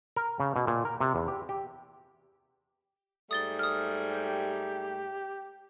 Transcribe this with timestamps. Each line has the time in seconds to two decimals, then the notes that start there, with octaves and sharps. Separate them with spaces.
0.16 A#4
0.40 C#3
0.56 B2
0.67 A#2
0.85 A#4
1.00 C3
1.15 E2
1.28 G4
1.49 G4
3.31 G#2 G3 A3 D#6 A6 G7
3.59 D#6 F6
4.11 G4